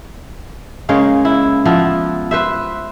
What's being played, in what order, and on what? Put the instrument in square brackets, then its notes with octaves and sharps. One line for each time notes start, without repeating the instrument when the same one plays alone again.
[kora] C#3 G#3 A#3 C#5
E4
F3 B3 E4
B4 C5 E5